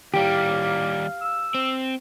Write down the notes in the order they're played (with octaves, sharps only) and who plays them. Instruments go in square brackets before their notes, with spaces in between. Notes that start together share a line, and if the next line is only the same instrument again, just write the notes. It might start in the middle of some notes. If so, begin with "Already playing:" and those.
[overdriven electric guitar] D#2 G3 [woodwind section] A2 A#3 [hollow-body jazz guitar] G4 [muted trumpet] F5
[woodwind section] E6
[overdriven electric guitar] C4